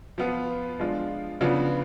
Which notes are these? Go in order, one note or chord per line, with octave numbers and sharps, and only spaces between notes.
F3 B3 F4
F3 G#3 D4 F4
C#3 F3 B3 D4 F4